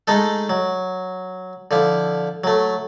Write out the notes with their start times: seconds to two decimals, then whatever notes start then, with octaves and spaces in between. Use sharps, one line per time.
0.07 G#3 A3 D#4 A4
0.49 F#3
1.71 D3 F3 E4
2.44 F#3 A3